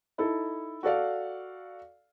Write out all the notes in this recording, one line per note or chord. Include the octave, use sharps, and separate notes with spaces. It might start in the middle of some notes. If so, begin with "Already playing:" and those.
D#4 E4 A4
F#4 A4 D5 F5